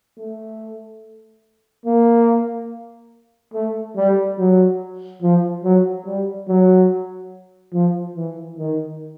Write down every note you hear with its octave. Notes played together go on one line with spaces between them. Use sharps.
A3
A#3
A3
G3
F#3
F3
F#3
G3
F#3
F3
E3
D#3